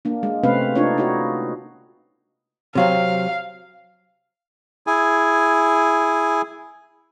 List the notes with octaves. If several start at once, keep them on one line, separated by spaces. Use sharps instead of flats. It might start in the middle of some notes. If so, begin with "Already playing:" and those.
A#3 D4
G#3
C3 A3 C4 C#4 B4 F5
D4 D#4 F4 C#5
D#4 E4 F#4 C#5
C3 F#3 C4 F5
E4 G#4 G#5